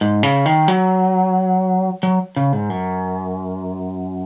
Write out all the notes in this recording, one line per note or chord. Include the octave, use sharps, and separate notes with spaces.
G#2
C#3
D#3
F#3
F#3
C#3
G#2
F#2